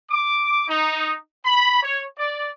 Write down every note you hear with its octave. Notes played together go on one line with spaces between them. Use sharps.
D6
D#4
B5
C#5
D5